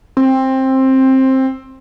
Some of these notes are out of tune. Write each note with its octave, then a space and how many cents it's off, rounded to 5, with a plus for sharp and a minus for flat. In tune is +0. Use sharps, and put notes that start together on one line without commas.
C4 +15